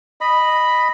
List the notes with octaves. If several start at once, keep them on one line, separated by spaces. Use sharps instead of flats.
D#5 B5